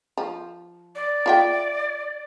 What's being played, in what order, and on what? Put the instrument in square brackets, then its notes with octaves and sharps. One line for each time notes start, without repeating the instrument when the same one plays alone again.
[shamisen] F3
[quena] D5
[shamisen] F4 E5 G5